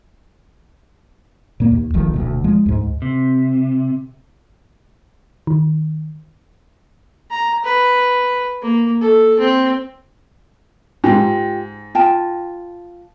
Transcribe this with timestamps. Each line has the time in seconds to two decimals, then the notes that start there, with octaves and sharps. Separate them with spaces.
1.60 A#2 A#3
1.72 D#2
1.94 D#1 A#1 D#3 F3
2.14 D#1 D2 B2
2.44 F3 G#3
2.66 D2 G#2
3.02 C3
5.47 D#3
7.31 A#5
7.64 B4
8.62 A#3
9.01 A4
9.39 C4
11.04 G#2 F4 G4
11.95 F4 G5 A5